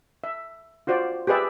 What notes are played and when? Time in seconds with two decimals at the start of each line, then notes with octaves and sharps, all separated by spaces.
0.24 E5
0.87 F4 F#4 C5 D5
1.27 G4 G#4 B4 D5 E5